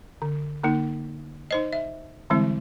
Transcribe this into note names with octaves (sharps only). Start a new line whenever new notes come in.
D3
D3 A#3 D#4
D#4 C5 D#5
E5
D3 E3 G3 G#3 C4 E4